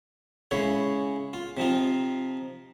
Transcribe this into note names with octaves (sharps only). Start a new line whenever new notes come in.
C#3 G#3 E4 C#5
F4
C3 F3 D#4 F4